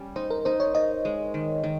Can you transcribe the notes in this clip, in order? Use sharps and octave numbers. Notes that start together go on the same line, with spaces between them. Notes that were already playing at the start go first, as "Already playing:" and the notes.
Already playing: G3 C#4
D#4 C5
A#4
D#4 C5
C#5
D#4 D#5
G#3
D#3
D#3